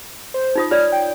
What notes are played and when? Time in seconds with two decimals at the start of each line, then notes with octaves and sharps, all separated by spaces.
0.34 C5
0.55 D#4 F4 D#6
0.71 F4 C#5 D5 F6
0.92 G5